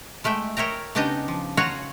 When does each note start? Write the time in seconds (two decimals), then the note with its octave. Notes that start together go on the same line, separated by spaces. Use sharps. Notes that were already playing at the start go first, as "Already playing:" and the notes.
0.24 G#3 A3 E5 G5
0.57 A#4 C#5 E5 G5 A#5
0.95 C#3 B3 D4 D#4 G4 D#5
1.28 F3
1.57 F4 F#4 C#5 F#5 G#5 A#5